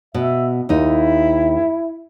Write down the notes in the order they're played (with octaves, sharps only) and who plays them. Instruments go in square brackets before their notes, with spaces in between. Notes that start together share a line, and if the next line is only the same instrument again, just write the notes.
[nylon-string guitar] B2 [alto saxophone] E5
[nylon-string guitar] D#2 D#4 [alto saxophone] E4